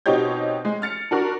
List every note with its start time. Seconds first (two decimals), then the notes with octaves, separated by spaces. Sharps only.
0.06 B2 C4 D#4 G4 C#5 G6
0.65 G#3
0.82 F6 A6 C#7
1.11 D4 F#4 A#4 C#6